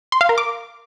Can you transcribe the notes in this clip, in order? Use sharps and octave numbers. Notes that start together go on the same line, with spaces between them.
C6
F5
A#4
D6